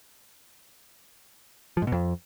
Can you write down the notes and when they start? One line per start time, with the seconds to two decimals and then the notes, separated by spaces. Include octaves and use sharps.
1.77 F3
1.82 G#2
1.87 B2
1.92 F2